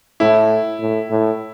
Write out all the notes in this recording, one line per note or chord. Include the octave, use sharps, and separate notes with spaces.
A2 E4
A2
A2